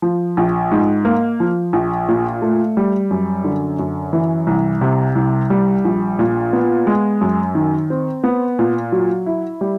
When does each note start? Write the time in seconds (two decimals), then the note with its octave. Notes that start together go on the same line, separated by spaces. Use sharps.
0.02 F3
0.37 A#1
0.72 G#2
1.05 A#3
1.40 F3
1.73 A#1
2.08 A#2
2.42 A3
2.77 G3
3.11 F#2
3.44 D3
3.79 F#2
4.13 E3
4.47 C2
4.81 C3
5.15 C2
5.50 G3
5.85 A#1
6.19 A#2
6.53 B3
6.87 G#3
7.21 F#2
7.55 D#3
7.90 C4
8.24 B3
8.59 A#2
8.92 F#3
9.26 E4
9.61 G3